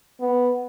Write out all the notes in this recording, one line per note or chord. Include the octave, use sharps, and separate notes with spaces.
B3